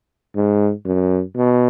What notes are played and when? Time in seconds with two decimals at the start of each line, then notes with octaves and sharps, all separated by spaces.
0.36 G#2
0.86 F#2
1.36 B2